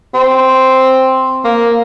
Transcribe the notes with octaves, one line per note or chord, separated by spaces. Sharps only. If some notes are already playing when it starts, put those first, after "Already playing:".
C4
A#3